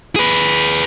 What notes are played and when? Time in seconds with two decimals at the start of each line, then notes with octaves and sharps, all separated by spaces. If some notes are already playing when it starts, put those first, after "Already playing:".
0.16 G#4 B4